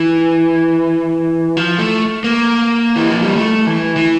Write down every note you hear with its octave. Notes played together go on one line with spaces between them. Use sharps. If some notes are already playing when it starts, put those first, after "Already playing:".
Already playing: E3
F3
A3
A#3
E3
F3
G3
A3
E3
E3